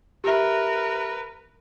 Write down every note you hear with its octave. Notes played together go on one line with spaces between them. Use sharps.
G4 A#4 B4 E5